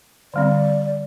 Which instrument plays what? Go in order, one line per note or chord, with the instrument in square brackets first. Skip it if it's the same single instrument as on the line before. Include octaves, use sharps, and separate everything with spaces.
[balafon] D3 G3 C4 [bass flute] D5